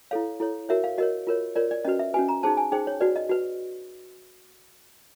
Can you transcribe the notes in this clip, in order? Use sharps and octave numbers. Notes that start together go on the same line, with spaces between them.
E4 A4 C#5 F5
E4 A4 C#5
F#4 A#4 C#5 E5
F5
F#4 A#4 C#5 D#5
F4 A#4 C#5
F4 A#4 C#5 D5
D5
C#4 F#4 B4 D#5
E5
C#4 F#4 B4 G#5
A#5
D#4 G#4 C5 A5
G#5
D#4 G#4 C5 G5
C#5
F#4 B4 D5
D#5
F#4 B4